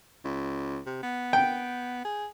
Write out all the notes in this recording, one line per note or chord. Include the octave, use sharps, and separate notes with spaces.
C#2
C3
B3
G5
G#4